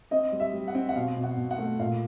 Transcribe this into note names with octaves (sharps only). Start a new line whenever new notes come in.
C4 D#5
G3
E5
G3
F#5
C4
F#5
B2 F5
B2
F#5
B2
F#5
A3
A#2 F5